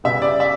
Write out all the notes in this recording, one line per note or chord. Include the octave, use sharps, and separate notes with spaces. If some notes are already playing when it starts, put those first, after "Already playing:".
C#3 G3 B3 E5
D5
E5